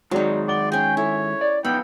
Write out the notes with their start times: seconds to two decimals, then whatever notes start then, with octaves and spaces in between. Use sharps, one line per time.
0.11 D#3 F#3 G#3 D#4 F#4 D5
0.48 D5 F#5 G7
0.72 C#4 G#4 G5
0.97 E4 A4 C#5
1.41 D5
1.65 B3 D#4 F4 G5 B5 E6